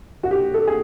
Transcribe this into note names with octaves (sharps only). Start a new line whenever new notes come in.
F#4
G4
A4
G#4